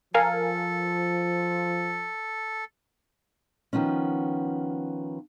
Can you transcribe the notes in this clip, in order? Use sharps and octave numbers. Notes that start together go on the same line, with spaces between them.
F3 A4 A#4 F5 G#5
D#3 F3 B3 C#4